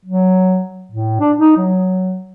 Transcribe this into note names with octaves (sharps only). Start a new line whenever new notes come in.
F#3
A2
D4
D#4
F#3